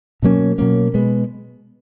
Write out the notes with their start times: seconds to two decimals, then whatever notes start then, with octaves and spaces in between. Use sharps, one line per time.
0.22 B2 F#3 A#3 C#4
0.58 B2 F#3 A#3 C#4
0.94 B2 G#3 B3